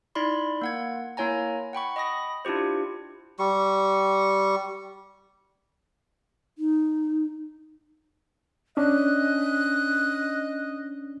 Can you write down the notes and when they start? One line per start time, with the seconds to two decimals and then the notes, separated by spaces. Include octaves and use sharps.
0.15 D#4 E4 D5 B5 C6
0.62 A#3 F#5 G#6
1.17 A#3 E4 C#5 G#5 A#5
1.73 F#5 G5 B5 C#6
1.96 D#5 B5 D#6 A#6
2.45 D4 E4 F4 G4 C5
3.39 G3 C#6
6.58 D#4
8.77 C#4 D4 D#5 F#6